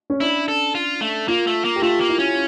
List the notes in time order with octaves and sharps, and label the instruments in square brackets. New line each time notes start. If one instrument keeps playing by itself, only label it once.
[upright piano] C#4
[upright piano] D4 [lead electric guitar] E4
[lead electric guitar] A4
F4
A3
[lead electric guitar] A#3 [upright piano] F4
[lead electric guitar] A3
A#3
[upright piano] G4
[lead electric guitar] A3 [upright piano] F4
[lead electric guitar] A#3
[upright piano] E4
[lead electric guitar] C#4